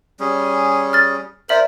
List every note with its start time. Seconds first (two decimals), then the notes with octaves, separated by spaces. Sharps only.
0.20 G3 C#4 G#4
0.93 F6 A6
1.49 A#4 C5 D5 E5 F#7